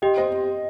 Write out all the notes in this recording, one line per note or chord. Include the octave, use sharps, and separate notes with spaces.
G4 D#5 G5
C5 D#5